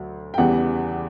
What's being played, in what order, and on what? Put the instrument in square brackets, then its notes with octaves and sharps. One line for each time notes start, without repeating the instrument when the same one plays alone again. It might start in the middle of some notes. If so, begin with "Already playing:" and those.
Already playing: [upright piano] D2 F#3
G5
E2 C#3 E3 G3 F#5